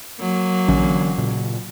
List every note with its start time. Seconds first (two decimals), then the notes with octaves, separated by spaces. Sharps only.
0.19 F#3 A#3
0.68 A#1 D3 E3 C#4
1.18 A#2 C#3